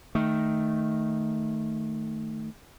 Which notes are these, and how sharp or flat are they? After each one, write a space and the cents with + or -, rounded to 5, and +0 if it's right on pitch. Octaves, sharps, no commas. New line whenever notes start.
D#3 +0 A3 +5